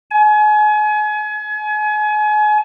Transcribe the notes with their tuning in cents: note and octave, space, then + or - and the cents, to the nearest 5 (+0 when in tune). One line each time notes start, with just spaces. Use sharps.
G#5 +35